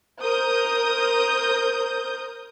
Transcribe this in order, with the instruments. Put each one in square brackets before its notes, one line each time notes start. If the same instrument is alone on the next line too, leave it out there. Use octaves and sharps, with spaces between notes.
[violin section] A#4 C5 D#6 G6